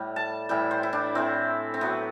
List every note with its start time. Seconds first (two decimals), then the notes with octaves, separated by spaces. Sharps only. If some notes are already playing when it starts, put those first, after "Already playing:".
Already playing: A2 G3
0.16 A5
0.49 A2 E3 G3 G5
0.71 C5
0.83 E4
0.93 D4
1.15 A2 E3 A3 C4
1.74 C4
1.81 A2 F#3 A3 B3